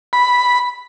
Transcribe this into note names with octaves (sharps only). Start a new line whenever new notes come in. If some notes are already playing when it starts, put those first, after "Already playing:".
B5